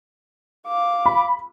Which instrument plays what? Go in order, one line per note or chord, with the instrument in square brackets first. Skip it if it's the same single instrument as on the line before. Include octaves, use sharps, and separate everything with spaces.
[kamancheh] F5 D6
[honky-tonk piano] B5